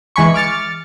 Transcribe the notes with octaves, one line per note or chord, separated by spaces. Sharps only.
E3 G#3 G#5 B5 C#6
D6 F6 A6 C#7